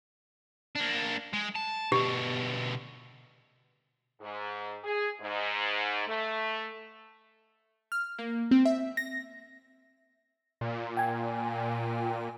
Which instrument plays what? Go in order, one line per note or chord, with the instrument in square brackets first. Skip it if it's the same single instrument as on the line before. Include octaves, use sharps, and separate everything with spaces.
[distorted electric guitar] A#3 D4
G#3
A5
[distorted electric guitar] B2 D3 [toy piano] G4
[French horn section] G#2
G#4
G#2
A3
[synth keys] F6
A#3
C4
E5
A#6
[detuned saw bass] A#2
[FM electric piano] G5 G#5